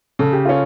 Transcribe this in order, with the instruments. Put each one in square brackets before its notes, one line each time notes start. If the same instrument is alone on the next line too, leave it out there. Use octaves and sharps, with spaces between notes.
[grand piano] C#3 [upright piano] A4
[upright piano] G4
[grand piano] C#4 [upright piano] F4 A4